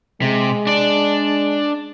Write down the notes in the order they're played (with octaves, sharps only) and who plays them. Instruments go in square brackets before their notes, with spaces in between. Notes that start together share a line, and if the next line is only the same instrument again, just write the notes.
[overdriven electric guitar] C3 [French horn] G#3
[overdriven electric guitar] D4 D5